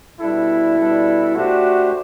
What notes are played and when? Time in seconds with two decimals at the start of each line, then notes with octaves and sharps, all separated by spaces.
0.20 B2 G3 D4 E4 A4
0.78 B2 G3 D4 A4
1.35 A3 D4 F#4 G4 C5